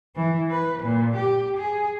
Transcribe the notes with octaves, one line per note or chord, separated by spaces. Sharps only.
E3
B4
A#2
G4
G#4